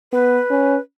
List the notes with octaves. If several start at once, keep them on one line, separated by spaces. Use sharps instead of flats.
B3 B4
C#4